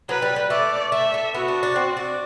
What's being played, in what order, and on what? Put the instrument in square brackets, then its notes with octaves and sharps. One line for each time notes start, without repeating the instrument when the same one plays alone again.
[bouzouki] F#3 [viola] B4
[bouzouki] G3
G3
[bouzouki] A3 [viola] D5
[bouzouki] A3 [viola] E5
[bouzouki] A3
[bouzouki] B3 [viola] F#4
[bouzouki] D4
D4
C4
D4